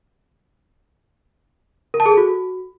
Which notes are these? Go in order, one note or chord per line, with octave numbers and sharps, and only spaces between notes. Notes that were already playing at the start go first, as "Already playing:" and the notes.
A#4
A5
G#4
A4
F#4